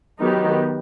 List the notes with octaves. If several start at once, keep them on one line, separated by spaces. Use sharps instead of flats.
D#3 F#3 B3 D#4 G4